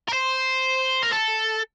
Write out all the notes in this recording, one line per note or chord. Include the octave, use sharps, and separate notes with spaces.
A#4
C5
A#4
A4